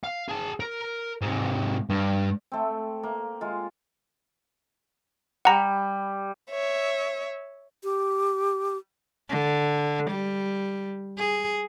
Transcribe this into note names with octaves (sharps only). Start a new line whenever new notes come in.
F5
G#4 A5
A#4
G#2 C3
G2
A3 C4
A#3
G#3 F4
G3 F#5 A#5
C#5 E5
G4
D3
G3
G#4